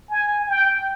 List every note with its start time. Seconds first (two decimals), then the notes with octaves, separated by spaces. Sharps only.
0.10 G#5
0.47 G5